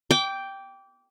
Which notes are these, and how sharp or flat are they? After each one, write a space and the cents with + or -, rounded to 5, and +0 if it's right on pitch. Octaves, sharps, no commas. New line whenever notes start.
G5 +0 D6 -25